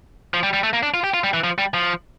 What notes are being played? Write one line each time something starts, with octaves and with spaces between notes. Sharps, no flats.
F3
G3
G3
A3
A#3
D4
F4
G4
F4
G3
E3
F3
G3
F3